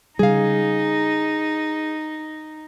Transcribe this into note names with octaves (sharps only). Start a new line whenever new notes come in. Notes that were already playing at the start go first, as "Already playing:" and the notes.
C#3 G3 D#4 G#4 F5